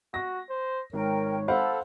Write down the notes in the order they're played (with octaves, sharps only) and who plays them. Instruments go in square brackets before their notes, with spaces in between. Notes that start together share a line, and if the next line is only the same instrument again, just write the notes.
[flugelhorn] F#4 [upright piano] A#6
[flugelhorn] C5
[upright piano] G#1 [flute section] A#4 G5 [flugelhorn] C#5
[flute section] A4 B5 E6 [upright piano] C5 F5 F#5